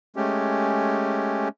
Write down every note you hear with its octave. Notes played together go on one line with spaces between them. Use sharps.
G#3 A3 C#4 G4